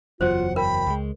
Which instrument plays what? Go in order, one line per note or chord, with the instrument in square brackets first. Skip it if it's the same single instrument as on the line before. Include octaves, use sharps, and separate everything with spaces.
[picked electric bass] F#1 E2 F#3 [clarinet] F4 [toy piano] C5 C#5 [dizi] F#5
[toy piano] A#4 [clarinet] G5 [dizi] B5
[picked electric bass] C#2 G3 G#3